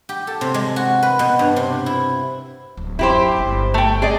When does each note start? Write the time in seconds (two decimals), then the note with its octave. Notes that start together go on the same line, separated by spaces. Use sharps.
0.09 G4
0.27 A4
0.41 C3
0.54 G#3
0.76 F#4
1.03 B4
1.19 B2
1.39 G2
1.56 C3
1.86 E4
2.77 D1
2.99 F#2 E4 G4 C5
3.38 G1
3.74 A3 G5
4.02 G#4 D5 D#5